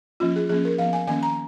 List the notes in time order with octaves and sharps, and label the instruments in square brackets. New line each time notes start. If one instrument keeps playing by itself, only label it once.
[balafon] F3 A#3 C#4 F4
G#4
F3 A#3 C#4 G#4
A#4
F3 B3 F5
G#5
D#3 A#3 C#4 G#5
A#5